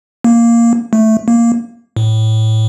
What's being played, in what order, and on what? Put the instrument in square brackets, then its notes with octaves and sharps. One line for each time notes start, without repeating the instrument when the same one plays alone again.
[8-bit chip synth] A#3
A3
A#3
A2